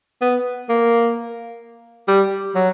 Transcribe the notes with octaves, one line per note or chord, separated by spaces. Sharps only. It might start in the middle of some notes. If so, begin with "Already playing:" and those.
B3
A#3
G3
F#3